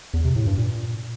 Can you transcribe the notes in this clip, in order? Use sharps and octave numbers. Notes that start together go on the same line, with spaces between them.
E2
C3
A2
G2
A#2